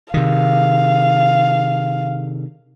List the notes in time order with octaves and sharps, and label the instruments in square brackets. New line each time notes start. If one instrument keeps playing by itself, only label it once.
[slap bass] C3 D#3 [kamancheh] F5